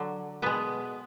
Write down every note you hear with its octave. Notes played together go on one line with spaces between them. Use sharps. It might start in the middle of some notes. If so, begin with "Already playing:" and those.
Already playing: D3 F#3
B2 G#3 B3 B4